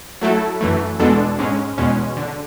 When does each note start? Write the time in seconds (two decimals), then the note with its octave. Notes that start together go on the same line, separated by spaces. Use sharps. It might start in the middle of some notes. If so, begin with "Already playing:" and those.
0.21 F#3 A3 E4 A4
0.61 F#2 E3 A3
1.00 E2 B2 G#3 D4 A4
1.39 G#2 G#3 C#4
1.78 E2 B2 G#3 C#4
2.17 D3